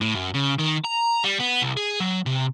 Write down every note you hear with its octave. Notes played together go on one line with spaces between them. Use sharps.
A2
F#2
C#3
D#3
A#5
G3
B3
C2
G#4
F#3
C3